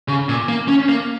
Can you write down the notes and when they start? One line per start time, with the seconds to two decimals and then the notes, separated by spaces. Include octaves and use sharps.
0.08 C#3
0.29 A#2
0.49 A#3
0.68 C#4
0.89 A#3